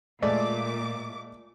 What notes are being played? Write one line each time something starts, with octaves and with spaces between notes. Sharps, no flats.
A#2 G#3 A3 D5 D6